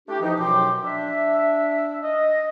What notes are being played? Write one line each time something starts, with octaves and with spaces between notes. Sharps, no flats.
A3 D4 E4 G4
E3 F3 D#4
F#2 B2 F#3 G5 C6 D6
D4 E5
D#5